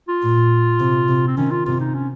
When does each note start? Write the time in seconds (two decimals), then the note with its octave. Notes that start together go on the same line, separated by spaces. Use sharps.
0.09 F4
0.22 A#2
0.80 C3
1.08 C3
1.28 C4
1.37 D#3 C#4
1.51 F4
1.65 C3 F4
1.80 D#4
1.95 C#4